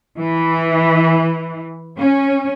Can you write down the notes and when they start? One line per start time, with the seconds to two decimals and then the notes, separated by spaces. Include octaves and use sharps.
0.16 E3
1.99 C#4